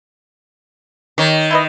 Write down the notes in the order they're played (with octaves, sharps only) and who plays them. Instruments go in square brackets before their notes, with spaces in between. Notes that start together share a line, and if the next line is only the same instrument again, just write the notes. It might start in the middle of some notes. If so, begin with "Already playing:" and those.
[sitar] D#3 [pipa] G4 C#5
[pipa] E4 B4 D#5